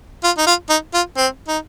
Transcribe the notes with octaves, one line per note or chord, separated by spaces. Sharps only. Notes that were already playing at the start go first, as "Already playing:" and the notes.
F4
D#4
F4
D#4
F4
C4
D#4